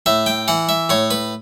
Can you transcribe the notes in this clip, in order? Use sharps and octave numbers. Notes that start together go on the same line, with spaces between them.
A2 E5
G5
E3 F#5
E5
A2 C#5
B4